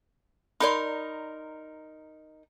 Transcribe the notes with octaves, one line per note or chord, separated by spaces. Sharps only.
D#4 A#4 D5 B5 C6